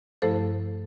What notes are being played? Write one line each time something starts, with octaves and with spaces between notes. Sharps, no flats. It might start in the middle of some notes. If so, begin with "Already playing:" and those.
G2 F3 A3 E4 A4 C5